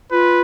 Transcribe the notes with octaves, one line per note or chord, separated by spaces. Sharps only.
F4 B4